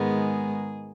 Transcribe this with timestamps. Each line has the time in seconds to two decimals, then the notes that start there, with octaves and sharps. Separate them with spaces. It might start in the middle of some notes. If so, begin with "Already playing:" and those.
Already playing: G#2 D#3 G#3 B3
0.16 G#4